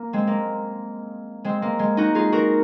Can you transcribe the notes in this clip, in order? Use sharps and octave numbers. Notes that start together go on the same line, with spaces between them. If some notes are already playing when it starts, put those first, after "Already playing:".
Already playing: A#3
G#3 C4
A#3
G#3 C4
A#3
G#3
D#4 F#4
F4 G#4
F#4 A#4